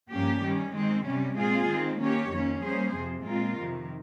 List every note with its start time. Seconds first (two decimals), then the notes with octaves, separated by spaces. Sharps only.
0.12 G2 F3 A#3 C#4 G4
0.43 D#3 G3 C#4
0.75 D#3 G#3 C4
1.06 C3 G3 C#4
1.37 A#2 G#3 C4 F4 G#4
1.69 D#3 G#3 C4
2.01 D#3 A#3 C#4 G4 C#5
2.32 F2 D#3 A#3 C#4
2.64 G3 A#3 C#4 G#4 C5
2.95 F2 C3 F3
3.27 A#2 G#3 C4 F4 A#4
3.58 F2 C3 D#3